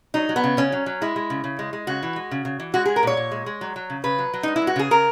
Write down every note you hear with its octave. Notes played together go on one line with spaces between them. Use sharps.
F#3 D#4
F#3
B3
C#3
C#3 C#4
F#3
F#3
G#3 E4
G#3
C#3
C#3
G#3
G#3
C#3 F#4
E3
G#3
C#3
C#3
E3
G#3 F#4
G#3 G#4
A#4
A#2 C#5
A#2
G#3
G#3
F#3
F#3
C#3
C#3 B4
F#3
F#3
G#3 D#4
E4
G#3
F#4
C#3 G#4
C#3 A#4